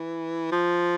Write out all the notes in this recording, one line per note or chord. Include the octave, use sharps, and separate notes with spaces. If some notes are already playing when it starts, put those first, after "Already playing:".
Already playing: E3
F3